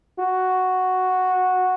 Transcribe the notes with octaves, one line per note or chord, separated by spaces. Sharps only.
F#4